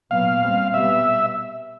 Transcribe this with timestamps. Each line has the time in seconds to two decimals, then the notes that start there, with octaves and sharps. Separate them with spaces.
0.11 A#2 F#3 B3 F5
0.42 A#2 G3 C4
0.74 B2 G3 B3 E5